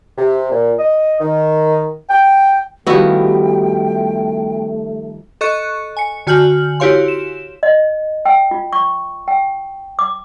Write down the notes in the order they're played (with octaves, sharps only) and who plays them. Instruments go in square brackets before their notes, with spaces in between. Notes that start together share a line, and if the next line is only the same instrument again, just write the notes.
[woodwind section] C3
A#2
D#5
D#3
G5
[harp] D#3 F3 G3 [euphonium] A3 [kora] B3 E4 F#4 [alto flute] G5
[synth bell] A4 D#5 C#6 F#6 C#7
G#5 C#7
D3 F#4 G#5 F6 G6 F#7
E4 F#4 G4 C#5 F5 C6
E7
[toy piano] D#5
G5
F4
C#6
G5
D6